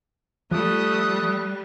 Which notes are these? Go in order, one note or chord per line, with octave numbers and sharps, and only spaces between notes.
F3 G3 A3 D#6 F#6